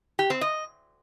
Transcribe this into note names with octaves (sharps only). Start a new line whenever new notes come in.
G4
C4
D#5